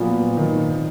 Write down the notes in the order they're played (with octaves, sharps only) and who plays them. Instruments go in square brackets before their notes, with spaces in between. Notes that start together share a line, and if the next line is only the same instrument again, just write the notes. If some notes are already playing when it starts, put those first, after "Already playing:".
Already playing: [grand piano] A#2 F#3 B3 [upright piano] F3
[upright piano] D#3